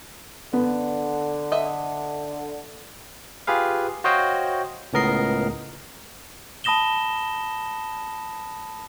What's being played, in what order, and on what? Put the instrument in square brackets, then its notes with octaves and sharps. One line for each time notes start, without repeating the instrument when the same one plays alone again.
[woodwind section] D3 [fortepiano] B3
[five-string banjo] D#5 E5
[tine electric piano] F4 G4 G#4 B4 F5
F#4 C5 C#5 D#5 F5 G5
C#2 A2 B3 A#4 D#5 C7
[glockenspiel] A5 B5 D#6 A#6 E7 G7